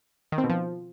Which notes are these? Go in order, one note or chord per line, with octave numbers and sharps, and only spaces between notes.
D#3
C4
B2
F3